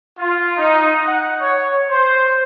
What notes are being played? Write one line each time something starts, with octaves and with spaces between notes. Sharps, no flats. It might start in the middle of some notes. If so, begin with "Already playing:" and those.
F4
D#4
F#5
C#5
C5